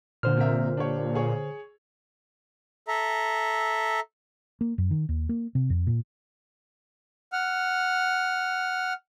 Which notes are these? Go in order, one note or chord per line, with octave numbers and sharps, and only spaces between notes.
A#2 D3 C5 F6
C3 A#4 E5
D4 G4 C#5
G#4 C#5
A4 E5 A#5
A#3
F#2
D#3
D#2
A#3
C3
F2
A#2
F#5 F6